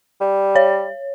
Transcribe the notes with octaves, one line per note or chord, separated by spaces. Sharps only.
G3
C#5